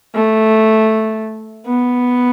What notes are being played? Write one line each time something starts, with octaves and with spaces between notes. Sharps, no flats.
A3
B3